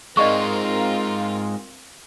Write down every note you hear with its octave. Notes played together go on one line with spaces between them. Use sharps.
G#3 C4 D#4 F4 A#4 D5 D#5 C#6